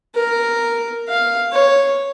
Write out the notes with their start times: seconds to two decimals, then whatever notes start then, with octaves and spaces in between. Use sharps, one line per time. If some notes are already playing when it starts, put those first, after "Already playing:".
0.15 A#4
1.08 F5
1.52 C#5